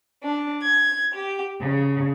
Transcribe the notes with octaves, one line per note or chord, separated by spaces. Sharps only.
D4
G#6
G4
C#3